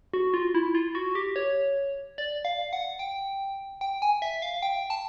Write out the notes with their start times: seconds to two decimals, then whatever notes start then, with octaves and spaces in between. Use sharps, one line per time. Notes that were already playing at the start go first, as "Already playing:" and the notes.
0.13 F#4
0.34 F4
0.54 E4
0.75 F4
0.95 F#4
1.15 G4
1.36 C#5
2.18 D5
2.45 F5
2.73 F#5
2.99 G5
3.81 G5
4.02 G#5
4.22 E5
4.42 F5
4.62 G5
4.90 A5